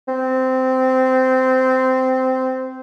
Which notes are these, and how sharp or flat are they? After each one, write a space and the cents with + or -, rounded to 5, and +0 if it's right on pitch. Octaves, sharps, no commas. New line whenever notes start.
C4 -15